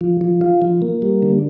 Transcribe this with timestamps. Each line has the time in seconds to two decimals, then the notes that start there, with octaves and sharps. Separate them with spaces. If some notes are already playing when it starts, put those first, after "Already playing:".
0.01 F3
0.21 F3
0.41 F4
0.62 F3
0.82 A#3
1.02 G3
1.22 D3